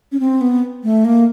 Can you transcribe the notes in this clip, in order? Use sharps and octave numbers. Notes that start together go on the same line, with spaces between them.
C#4
C4
B3
A3
A#3